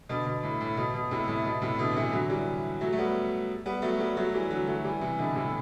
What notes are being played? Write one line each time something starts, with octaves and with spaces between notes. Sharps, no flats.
B2 D3
B2
A2
A2
B2
B2
A2 C3
A2
B2
A2 C3
B2 D3
C3 E3
D3 F#3
E3 G3
F#3 A3
A3
G3 B3
G3 B3
F#3 A3
G3 B3
F#3 A3
E3 G3
D3 F#3
F#3 A3
E3 G3
C3 E3
B2 D3
A2 C3